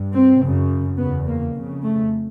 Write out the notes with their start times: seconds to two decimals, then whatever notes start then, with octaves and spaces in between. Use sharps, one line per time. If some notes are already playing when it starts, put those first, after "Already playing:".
Already playing: G2
0.13 C4
0.40 F#2 C#3
0.98 E2 C#3 B3
1.26 A#3
1.55 F2 C#3
1.83 A3